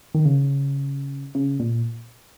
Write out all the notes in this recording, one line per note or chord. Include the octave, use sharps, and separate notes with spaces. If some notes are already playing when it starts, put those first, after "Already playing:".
D#3
C#3
C#3
A#2